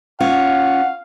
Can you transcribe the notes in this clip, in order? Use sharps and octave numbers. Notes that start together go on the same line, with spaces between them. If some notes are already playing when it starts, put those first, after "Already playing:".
C#4 F4 C#5 F5 F#5